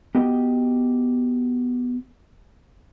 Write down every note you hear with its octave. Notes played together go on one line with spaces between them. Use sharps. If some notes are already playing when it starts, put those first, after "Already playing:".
B3 F#4 G4 D#5 G5